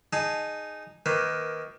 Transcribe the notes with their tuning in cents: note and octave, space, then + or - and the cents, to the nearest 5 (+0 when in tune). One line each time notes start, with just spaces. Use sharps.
D#4 -15 G#4 +0 A5 +0
D#3 +20 A#3 +15 B4 +20